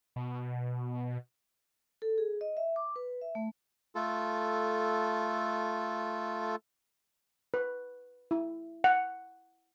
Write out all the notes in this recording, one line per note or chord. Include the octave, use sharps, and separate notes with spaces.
B2
A4
G#4
D#5
E5
D6
B4
E5
A3
A3 F4 A4
B4
E4
F#5